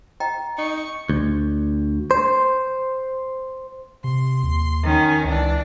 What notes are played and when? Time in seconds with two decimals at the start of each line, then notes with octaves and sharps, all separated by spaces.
0.20 D#5 G5 A#5
0.58 D#4 C#6
1.10 D2
2.11 C5
4.04 C3 C6
4.43 D#2
4.83 D#3 C#4
5.24 C#2 E3 D4